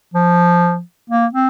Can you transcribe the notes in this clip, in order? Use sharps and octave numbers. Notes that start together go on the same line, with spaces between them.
F3
A#3
C4